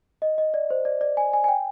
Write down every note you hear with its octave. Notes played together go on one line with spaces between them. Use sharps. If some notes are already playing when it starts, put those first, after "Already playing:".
D#5
D#5
D5
C5
D5
D5
G#5
G#5
G#5
G5